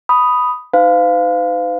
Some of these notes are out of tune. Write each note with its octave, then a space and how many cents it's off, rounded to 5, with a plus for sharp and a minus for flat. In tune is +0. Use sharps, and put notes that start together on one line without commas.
B5 +0 D#6 +0
D#4 +0 C5 -45 F5 +0